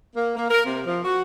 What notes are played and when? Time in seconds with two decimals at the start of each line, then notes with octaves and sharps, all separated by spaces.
0.15 A#3
0.36 A#3
0.50 A#4
0.66 C3
0.87 F3
1.04 F#4